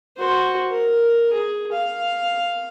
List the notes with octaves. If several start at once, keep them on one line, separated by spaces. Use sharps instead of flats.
F#4 C5
A#4
G#4
F5